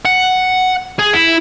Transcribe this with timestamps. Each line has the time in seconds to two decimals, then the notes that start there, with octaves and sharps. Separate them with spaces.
0.05 F#5
0.99 G#4
1.13 E4